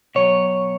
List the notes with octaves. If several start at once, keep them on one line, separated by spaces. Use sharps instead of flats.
B2 F#3 C#5